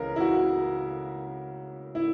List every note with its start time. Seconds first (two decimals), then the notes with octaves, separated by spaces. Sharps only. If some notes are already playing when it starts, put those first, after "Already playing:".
Already playing: C#2 C#3 E3 A#4
0.16 E4
0.20 F#4
1.95 E4